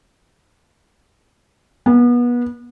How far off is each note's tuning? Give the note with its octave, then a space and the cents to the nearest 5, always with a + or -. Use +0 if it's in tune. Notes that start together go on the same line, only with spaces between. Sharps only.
B3 -30